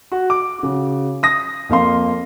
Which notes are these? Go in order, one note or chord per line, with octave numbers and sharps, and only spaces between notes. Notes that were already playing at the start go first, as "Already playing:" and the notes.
F#4
D6
C#3 F#4
D#6 A#6
F2 A#3 F5 C6